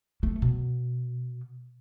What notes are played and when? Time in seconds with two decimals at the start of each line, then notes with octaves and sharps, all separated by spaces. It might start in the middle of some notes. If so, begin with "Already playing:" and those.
0.23 A3
0.42 B2